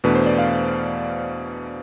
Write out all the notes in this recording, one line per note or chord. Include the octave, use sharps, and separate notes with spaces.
E2 B2 A3 D4 B4
C5
D5
F5